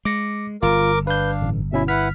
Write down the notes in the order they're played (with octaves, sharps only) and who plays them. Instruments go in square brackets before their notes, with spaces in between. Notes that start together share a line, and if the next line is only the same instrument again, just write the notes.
[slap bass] G#3 [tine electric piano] D6 A#6 C#7
[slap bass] G1 [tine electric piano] F4 [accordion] A#4 D6
[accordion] D4 F5 [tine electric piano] B4 G6
[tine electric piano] A1
[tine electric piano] B2 C#4 E4 [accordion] E5
[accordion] E4 B4 F#5 [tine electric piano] F6 B6